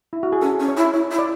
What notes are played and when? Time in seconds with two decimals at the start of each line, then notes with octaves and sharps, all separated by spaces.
0.13 E4
0.23 F#4
0.32 G#4
0.42 C#4 A4
0.60 C#4
0.68 C#5
0.77 E4
0.93 E4 C#5
1.11 E4
1.19 D5